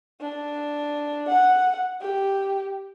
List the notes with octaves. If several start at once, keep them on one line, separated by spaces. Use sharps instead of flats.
D4
F#5
G4